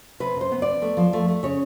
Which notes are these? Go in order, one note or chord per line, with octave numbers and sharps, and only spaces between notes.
C3 B4
C3 C5
B3
B3 D5
A3
F3
A3
A3
C#3 C#5